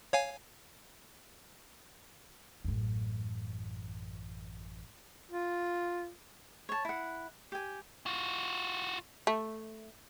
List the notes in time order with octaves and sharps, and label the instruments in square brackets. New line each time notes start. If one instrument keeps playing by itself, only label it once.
[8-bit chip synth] C#5 F5 G#5
[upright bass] A1 F#2
[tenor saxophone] F4
[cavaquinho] C#5 A5
E4 F#5
G4 G#5
[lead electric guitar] F4 F#4
[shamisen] A3